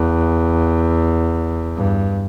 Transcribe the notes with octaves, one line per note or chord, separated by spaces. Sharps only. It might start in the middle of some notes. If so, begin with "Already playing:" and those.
Already playing: E2
G2